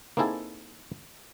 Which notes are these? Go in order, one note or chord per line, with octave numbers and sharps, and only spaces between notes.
A#3 C4 D#4 E4 G#4 A4